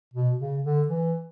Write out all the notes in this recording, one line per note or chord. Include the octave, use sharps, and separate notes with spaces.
B2
C#3
D3
E3